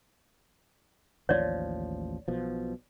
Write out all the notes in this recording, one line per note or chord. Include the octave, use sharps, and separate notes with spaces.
A1 D#2 F3 C#5 D5
B1 B2 F3